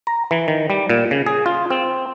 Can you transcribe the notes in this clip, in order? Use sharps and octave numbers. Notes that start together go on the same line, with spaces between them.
A#5
E3
D#3
G3
A#2
C#3
G#4
F4
C4